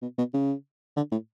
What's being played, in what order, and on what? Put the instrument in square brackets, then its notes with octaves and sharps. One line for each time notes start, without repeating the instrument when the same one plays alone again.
[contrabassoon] B2
B2
C#3
D3
A2